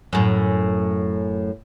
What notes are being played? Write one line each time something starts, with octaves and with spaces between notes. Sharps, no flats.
F#2 A2